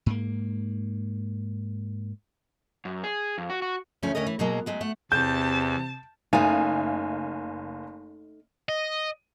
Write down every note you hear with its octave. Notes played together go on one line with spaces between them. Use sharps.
G#2 A#3
F#2
G#4
F2
F#4
F#4
D2 F3 A3 C#4
D#2 D3 C#4 A#4 D#5
E3
B2 F#3 G#3 A#3
F#3 G#3 A3
A3 F#5
E2 C3 A5 G6
F#1 A3 D#4 F5 G#5
D#5